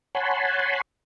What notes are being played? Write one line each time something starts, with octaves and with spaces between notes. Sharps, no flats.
C#5 F#5 G#5 A5 B5 C6